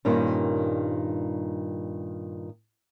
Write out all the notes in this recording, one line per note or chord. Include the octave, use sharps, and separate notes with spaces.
G2 A#2 D#3 G3 C#4